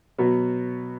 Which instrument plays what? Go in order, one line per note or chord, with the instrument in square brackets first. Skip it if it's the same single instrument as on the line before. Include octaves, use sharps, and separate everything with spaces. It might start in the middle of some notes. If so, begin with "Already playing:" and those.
[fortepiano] B2 F#3 B3 F#4